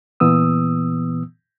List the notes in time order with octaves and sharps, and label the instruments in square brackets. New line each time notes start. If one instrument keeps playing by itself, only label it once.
[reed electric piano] A#2 E3 B3 D#6 E6